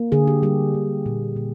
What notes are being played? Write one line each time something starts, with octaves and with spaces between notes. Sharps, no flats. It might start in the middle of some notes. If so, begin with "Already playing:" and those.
Already playing: A#3
D3 G#4
G4
G3 G4
D3
A#2
A#2